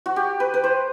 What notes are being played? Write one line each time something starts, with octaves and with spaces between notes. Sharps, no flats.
F#4
G4
B4
B4
C5